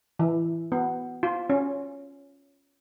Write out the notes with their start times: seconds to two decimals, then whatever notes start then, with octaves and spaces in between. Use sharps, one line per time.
0.19 E3
0.72 B3
1.23 F4
1.50 C#4